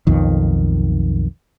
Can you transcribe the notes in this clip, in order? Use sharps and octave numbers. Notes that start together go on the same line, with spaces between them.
B1 F2 D#3